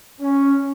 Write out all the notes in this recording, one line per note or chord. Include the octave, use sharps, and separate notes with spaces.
C#4